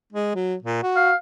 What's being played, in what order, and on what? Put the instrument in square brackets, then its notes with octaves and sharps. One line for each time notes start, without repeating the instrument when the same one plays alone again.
[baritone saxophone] G#3
F#3
A#2
F#4
[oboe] F5